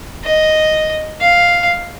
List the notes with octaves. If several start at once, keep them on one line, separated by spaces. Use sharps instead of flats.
D#5
F5